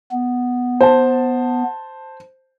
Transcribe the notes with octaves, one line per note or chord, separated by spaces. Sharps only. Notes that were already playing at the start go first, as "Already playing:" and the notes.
B3
C5 A5